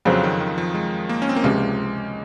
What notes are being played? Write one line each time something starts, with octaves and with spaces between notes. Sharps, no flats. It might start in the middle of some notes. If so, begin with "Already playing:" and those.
F2 C#3 F3 F#3 C4
D#3
D#3
F3
G#3
A#3
C#4
C4
A#3
C#2 C3 F3 G#3